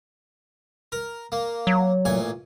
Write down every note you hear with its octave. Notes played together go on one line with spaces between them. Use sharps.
A#4
A#3
F#3
A1 A#2 G#5